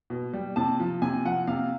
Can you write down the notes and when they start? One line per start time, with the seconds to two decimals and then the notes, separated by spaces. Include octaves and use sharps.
0.10 B2
0.33 G3
0.56 C3 A5
0.80 F3
1.02 C3 G#5
1.25 F3 F#5
1.47 C3 F5